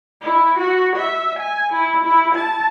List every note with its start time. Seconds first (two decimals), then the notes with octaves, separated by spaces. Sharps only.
0.22 E4
0.58 F#4
0.96 E5
1.39 G#5
1.73 E4
2.05 E4
2.35 A5